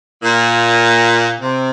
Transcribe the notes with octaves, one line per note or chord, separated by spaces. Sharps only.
A#2
C3